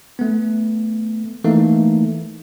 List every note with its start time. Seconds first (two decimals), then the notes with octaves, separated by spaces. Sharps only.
0.19 A3 B3
1.44 E3 A3 A#3 D#4